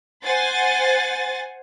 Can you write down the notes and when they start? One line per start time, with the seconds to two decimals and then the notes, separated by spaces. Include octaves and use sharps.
0.24 C5 F#5 G#5 A6